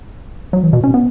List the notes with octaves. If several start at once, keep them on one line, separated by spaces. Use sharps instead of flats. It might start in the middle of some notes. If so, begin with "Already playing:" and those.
F#3
E3
B2
C#4
B3